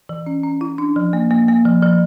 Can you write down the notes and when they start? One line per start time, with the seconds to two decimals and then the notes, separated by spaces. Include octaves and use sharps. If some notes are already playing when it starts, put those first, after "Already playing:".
0.09 E3
0.26 C#4
0.44 C#4
0.61 E4
0.78 D4
0.96 F3
1.13 A#3
1.31 A#3
1.48 A#3
1.65 F3
1.82 F3